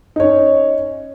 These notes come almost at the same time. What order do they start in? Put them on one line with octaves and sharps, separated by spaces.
D#4 C#5 C#4